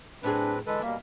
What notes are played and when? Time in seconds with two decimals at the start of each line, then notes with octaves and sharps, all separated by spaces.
0.23 A2 F#3 C4 D4 G#4 B4
0.67 D3 E3 G#3 A4 B4
0.82 B2 G3 A#3 E5